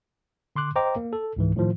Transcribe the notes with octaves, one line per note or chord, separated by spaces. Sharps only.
D3 C6 D6 F#6
C5 D#5 G5 A#5 D6
A#3
A4
C#2 G#2 E3
A2 D#3 F3